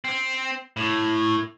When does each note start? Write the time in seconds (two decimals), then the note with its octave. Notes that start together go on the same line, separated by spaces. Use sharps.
0.05 C4
0.77 A2